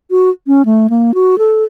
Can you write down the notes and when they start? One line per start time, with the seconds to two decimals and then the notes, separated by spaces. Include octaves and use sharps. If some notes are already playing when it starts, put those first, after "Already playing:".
0.11 F#4
0.47 C#4
0.65 A3
0.90 A#3
1.14 F#4
1.38 A4